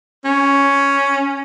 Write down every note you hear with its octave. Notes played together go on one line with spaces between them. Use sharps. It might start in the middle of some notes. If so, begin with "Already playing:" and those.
C#4